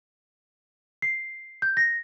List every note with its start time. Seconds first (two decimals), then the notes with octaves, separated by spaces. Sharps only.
1.02 C7
1.62 G6
1.77 A#6